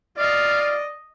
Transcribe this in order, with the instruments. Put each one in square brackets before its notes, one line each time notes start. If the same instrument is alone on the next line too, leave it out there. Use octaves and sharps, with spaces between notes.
[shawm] F4 [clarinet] D5 [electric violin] D#5